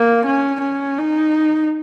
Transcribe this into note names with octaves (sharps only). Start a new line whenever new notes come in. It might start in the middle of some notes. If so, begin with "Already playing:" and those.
Already playing: A#3
C#4
C#4
D#4